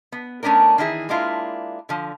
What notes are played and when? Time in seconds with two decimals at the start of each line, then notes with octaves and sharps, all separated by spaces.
0.12 B3
0.43 A3 B3 C#4 D4 A#4
0.78 D#3 E3 E4 G#4
1.09 G#3 A#3 D4 E4 F4
1.89 D3 F3